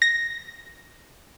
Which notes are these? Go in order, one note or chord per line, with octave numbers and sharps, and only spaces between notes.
A#6